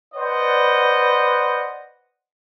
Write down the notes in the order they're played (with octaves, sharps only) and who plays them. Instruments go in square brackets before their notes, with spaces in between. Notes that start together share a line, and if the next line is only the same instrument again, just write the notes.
[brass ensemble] B4 C5 D5 D#5 F#5